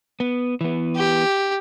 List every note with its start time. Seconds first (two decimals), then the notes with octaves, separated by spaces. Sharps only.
0.20 B3
0.61 E3 B3
0.96 G4